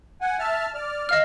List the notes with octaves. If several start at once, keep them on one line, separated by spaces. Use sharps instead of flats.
F#5 G#5
E5 A5 F6
D5 F6
D#5 F5 F6